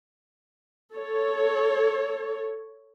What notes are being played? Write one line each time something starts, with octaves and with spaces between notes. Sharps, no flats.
A4 C#5